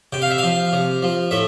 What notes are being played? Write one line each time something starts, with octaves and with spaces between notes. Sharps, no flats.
C3 G5
F5
E5
F3 F5
C3
F3
A2 E5